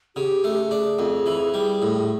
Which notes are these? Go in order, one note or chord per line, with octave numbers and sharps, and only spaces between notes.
C#3 G4
A3 G4
G#4
D4
F2
E3
G3
A2